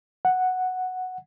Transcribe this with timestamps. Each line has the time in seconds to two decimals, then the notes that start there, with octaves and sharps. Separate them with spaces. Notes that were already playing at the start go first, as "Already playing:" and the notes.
0.25 F#5